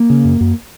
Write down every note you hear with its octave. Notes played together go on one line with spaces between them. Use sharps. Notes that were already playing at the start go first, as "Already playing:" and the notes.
Already playing: A#3
C#3
F#2
F#2